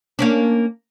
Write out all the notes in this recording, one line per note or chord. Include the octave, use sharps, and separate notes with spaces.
A#3 C#4 D4